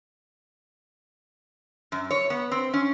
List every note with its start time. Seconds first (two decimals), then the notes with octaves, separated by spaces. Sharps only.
1.92 F#2
2.11 C#5
2.30 B3
2.51 C4
2.74 C#4